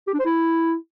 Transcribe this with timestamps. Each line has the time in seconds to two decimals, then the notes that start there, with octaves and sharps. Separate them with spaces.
0.08 G4
0.14 D4
0.19 C5
0.25 E4